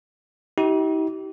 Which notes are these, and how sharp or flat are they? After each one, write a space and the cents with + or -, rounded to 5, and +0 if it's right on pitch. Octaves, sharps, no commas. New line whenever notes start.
D#4 +45 G4 -30